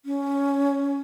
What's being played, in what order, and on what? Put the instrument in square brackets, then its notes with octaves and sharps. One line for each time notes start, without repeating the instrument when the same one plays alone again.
[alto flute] C#4